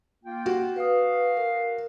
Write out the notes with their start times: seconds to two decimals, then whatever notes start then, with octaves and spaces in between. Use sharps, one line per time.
0.24 A#3 F4 G5
0.46 F#4
0.76 B4 F5 D#6
1.37 A#4